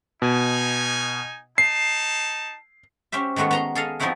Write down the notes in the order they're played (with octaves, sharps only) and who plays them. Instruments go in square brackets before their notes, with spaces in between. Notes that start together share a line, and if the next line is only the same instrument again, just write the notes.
[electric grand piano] B2 [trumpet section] D#4 G#5
[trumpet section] D#4 A5 [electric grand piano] C7
[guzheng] C#4 G4 C5 E5
D#3 G#3 A3 B3 F#4
B3 A#5 C6
G#4 A4 D#5 F5
F3 B3 C4 D#4 E4 F#4